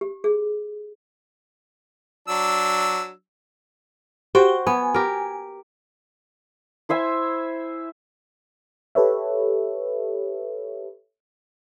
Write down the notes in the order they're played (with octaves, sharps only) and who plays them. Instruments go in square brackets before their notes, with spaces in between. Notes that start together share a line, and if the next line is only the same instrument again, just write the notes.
[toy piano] G4
G#4
[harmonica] F#3 D4 E6
[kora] F#4 C5 G5 [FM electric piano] G4
[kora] B3 [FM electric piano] G#5
[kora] G4 A#4
[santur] E4 C5 E5 G#5
[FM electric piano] G4 A4 B4 C#5 E5